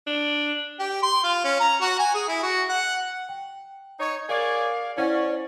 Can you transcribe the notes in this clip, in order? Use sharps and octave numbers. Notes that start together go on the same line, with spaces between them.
D4
G4
C6
F4
C#4
A#5
F#4
G#5
G#4
E4
F#4
F#5
G5
D#4 C#5
G#4 A#4 C#5 D5 F5
C#4 E4 C5 D5 F#5